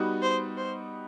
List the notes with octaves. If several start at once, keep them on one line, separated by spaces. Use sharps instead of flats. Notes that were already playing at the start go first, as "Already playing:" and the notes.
Already playing: G3 B3 D#4 F#4
C5
C5